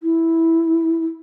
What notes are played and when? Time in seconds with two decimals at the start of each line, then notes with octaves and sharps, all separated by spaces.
0.02 E4